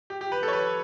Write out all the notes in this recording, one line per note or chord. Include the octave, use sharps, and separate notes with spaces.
G4
G4
B4
A4
C#5
B4